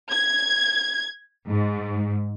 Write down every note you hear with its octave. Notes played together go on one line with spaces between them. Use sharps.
G#6
G#2